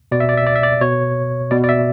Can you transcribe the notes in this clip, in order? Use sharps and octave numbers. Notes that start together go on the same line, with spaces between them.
B2 D5
E5
D5
E5
D5
E5
D5
B2 C#5
B2 D5
D5
E5